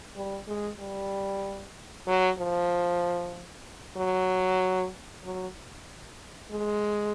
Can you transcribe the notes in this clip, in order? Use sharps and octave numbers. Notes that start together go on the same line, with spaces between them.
G3
G#3
G3
F#3
F3
F#3
F#3
G#3